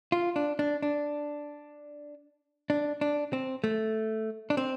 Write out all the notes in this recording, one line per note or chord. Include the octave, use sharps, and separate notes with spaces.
F4
D4
D4
D4
D4
D4
C4
A3
D4
C4